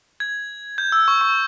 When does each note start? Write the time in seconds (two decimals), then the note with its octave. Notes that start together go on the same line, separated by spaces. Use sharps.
0.20 G#6
0.78 G6
0.92 E6
1.08 C#6
1.21 C#6